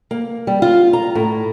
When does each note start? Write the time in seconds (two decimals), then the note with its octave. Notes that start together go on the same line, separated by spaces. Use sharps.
0.11 A#3
0.47 G3
0.62 F4
0.93 A#5
1.15 A2